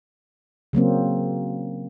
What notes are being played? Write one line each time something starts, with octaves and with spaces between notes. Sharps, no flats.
C#3 F#3 A#3 C4